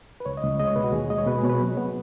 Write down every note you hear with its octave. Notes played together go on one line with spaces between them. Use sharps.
B4
C#2 C#5
D#5
C#2
G#3 D#5
C#5
B2 B4
F#4
D#2 G#4
G#3 D#5
C#5
B2 B4
G#4
B2 C#5
B4
F#3
B3